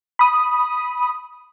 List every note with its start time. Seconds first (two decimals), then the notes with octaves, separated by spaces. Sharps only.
0.19 B5 D#6